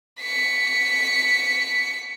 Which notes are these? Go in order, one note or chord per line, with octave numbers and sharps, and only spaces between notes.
B6 C#7